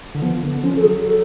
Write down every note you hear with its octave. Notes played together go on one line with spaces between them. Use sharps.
D3
F3 B3
D3 B3
F3 C#4
F3 A4
F#3 G#4
F#3 A4